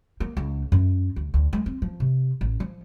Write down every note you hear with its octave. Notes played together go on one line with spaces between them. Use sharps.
A#3
C#2
F#2
D2
D2
G#3
C4
F3
C3
A1
F3